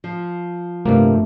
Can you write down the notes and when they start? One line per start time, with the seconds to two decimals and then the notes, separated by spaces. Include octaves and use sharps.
0.04 F3
0.86 G2 C3 A3 A#3